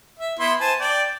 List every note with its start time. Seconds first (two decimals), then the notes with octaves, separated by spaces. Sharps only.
0.19 E5
0.39 B3 E4 C6
0.61 C5 G#5 A5
0.80 D5 G5